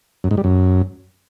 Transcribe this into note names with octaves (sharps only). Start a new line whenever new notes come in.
F#2
G#2
G3
F#2